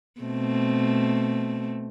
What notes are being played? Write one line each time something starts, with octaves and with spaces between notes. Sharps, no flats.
B2 A3 C4